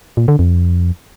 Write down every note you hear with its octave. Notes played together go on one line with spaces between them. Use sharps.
A#2
D3
F2